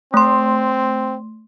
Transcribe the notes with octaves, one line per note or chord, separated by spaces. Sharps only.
A3 C4 C6